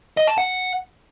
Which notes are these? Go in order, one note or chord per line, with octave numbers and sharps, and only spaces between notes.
D#5
A5
F#5